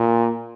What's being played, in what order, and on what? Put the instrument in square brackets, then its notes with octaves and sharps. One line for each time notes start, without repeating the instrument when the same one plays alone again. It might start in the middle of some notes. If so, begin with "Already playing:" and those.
Already playing: [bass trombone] A#2